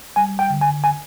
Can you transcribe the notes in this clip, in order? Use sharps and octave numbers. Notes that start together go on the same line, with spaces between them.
G3 G#5
G5
D3
G#5
G#5